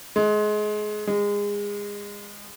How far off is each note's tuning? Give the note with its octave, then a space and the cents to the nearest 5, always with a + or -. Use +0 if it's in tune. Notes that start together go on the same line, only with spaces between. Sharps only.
G#3 +25
G#3 -25